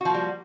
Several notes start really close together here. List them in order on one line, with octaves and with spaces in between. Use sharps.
F#4 F3 A#3 G3